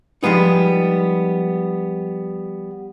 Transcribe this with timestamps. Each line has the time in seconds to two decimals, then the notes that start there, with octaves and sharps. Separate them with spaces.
0.23 F3 G3 G#3 B3 D#4